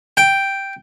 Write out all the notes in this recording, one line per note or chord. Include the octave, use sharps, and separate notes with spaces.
G5